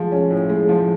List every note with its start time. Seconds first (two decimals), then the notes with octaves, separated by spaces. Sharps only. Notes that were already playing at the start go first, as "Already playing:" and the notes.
Already playing: F3 G#3
0.12 C#4
0.31 A2
0.49 G#3
0.69 F3